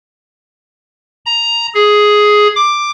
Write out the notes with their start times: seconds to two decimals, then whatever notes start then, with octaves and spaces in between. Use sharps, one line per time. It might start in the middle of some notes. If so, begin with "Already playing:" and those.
1.26 A#5
1.74 G#4
2.56 D6